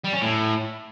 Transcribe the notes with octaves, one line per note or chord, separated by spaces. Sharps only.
G3
C#4
A2